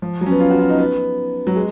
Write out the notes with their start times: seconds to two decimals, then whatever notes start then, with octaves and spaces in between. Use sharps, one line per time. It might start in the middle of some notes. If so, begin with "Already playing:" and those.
0.02 F3
0.21 F#3
0.26 C#4
0.31 B3
0.40 F4
0.50 F#4
0.59 F4
0.69 D#4
0.79 B3
1.47 F#3
1.56 G#3